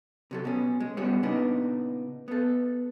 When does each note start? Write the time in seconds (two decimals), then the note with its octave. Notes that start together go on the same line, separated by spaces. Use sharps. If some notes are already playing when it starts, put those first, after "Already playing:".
0.31 C3 F#3 A4
0.45 B2 C#4
0.80 G#3
0.97 G3 B3 C#4 F#4 G#4 C#5
1.23 A#2 C#3 B3 D4 D#4 F#4
2.28 B3 A4